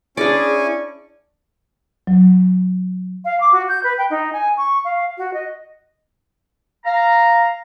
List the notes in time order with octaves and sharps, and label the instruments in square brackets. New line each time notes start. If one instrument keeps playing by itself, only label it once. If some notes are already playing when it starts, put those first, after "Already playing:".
[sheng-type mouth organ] C#4 G#5 C#6 [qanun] D4 D5 [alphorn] E4 [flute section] G#4
[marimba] F#3
[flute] F5
D6
F#4
G6
B4
G5
D#4
G#5
C#6
F5
F#4
D#5
[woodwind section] F5 A#5